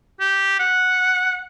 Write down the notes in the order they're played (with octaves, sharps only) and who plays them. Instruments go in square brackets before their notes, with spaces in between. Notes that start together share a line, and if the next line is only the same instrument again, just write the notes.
[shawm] G4
F#5